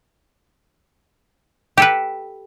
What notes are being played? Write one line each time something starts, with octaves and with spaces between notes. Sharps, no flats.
G4 A4 B4